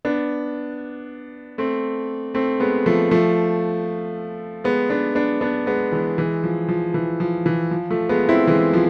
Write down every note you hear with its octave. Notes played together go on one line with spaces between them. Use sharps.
B3 D4
A3 C4
A3 C4
G#3 B3
F3 A3
F3 A3
G#3 B3
B3 D4
B3 D4
B3 D4
G#3 B3
E3 G#3
E3 G#3
F3
F3
E3
F3
E3
F3
F3 A3
G#3 B3
C4 E4
E3 G#3
F3